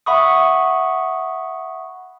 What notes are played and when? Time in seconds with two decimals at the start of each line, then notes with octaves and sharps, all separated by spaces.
0.06 E5 F#5 B5 C#6 D#6